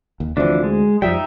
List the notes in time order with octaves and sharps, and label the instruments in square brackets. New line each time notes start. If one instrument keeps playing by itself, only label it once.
[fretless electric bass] D#2
[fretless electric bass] D2 C4 [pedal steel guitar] E3 F3 D4
[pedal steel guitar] G#3
[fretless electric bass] F2 F3 G3 [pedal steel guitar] D#4 E5 G5